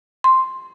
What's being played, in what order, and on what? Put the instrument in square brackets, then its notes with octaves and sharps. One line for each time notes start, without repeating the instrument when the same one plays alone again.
[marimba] C6